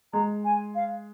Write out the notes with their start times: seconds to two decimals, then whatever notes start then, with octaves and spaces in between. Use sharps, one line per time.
0.13 G#3 A#5
0.45 G#5
0.75 F5